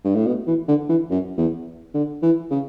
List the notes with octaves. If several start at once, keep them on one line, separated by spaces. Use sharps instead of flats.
G2
A2
B2
E3
D3
E3
F#2
E2
D3
E3
C#3